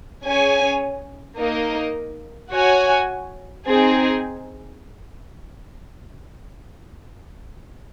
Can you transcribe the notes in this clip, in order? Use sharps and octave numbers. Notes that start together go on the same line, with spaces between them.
C#4 G#4 C#5 G#5
A#3 D#4 A#4 D#5
F#4 C#5 G#5
C4 D#4 G#4